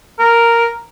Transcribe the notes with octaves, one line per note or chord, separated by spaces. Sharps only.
A#4